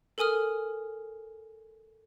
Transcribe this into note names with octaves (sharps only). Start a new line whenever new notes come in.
A4 A#4 G#5 D#6 F6